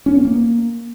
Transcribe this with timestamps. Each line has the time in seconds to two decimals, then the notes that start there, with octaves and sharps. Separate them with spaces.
0.06 C#4
0.16 B3
0.25 A#3